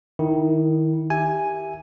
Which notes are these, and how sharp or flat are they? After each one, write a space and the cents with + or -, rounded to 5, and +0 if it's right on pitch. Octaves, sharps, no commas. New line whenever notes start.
D#3 +0 E4 -25
G4 +0 E5 +0 G#5 +0